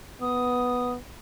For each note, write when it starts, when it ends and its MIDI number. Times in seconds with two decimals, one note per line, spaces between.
0.21 0.96 59
0.21 0.91 87